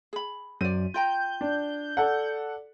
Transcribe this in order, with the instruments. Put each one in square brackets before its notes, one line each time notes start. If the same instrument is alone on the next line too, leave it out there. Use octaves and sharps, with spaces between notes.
[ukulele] G#4 B5
[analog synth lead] F#2 [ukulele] C5 D5 [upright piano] D#7
[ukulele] F4 G5 A#5 [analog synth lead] G6
[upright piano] D4
A4 D5 F#5